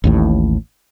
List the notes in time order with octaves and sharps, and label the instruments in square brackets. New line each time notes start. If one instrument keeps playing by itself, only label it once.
[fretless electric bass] A1 D#2 A2